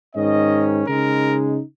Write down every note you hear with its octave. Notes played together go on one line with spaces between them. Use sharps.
G#2 D#3 C#4 D#5
C#3 G#3 D#4 A#4